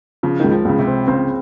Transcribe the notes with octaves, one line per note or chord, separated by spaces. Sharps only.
C#3 F3
C#2 D#3
F3
C#2 C#3
C3
C4
C#3 C4